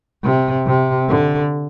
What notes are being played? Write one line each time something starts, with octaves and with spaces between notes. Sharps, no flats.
C3
C3
D3